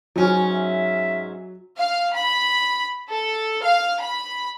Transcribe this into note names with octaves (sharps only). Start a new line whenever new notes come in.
G#2 F#3 C#4
E5
F5
B5
A4
F5
B5